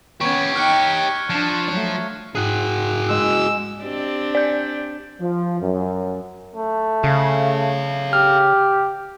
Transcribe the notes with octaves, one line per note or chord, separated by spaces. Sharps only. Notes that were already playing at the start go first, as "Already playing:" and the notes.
B3 C#4 G4 C#5 C#6 G#6
D#4 G5 F6 F#6 C#7
F3 D4
F#3 A3
G#2 F#4 G#4 F#6
G#3 E6
C4 D4 G4
D5 G6
F3
F#2
A3
C#3 A4 F5
G4 F6